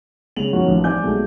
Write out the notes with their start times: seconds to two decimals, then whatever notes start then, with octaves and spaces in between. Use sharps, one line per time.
0.36 C#3 G3 G#3 F7 F#7
0.53 F3 A#3 C#4 D#4 F#4
0.68 A1 D#3 F3
0.84 G3 C4 D5 G#5 D6 G6
1.03 B1 B2 G#3 A3